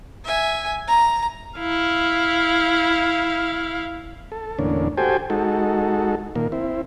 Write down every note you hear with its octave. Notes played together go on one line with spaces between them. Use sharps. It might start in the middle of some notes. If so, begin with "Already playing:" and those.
E5 G#5
A#5
E4 F5
A4
E2 A2 D3 A#3 C#4 D4
F#4 G4 A4 C5 G5 G#5
G#3 D#4 F#4 A4
A#2 D#3 A#3
C4 E4